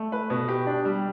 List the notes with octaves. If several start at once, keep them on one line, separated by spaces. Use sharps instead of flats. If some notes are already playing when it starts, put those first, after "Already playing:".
Already playing: A3
B4
B2
G4
D4
G3